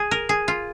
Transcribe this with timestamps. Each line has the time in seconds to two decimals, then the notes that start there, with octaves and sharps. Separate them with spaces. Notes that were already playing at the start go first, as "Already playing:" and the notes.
Already playing: G#4
0.11 A#4
0.29 G#4
0.48 F4